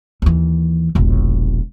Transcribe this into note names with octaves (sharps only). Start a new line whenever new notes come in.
D#2 E3
E1 A#1